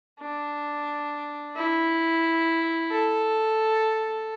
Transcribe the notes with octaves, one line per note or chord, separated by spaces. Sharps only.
D4
E4
A4